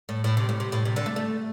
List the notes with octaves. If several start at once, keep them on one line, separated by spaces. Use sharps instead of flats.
A2
A2
C3
A2
C3
A2
C3
D3
A3
A3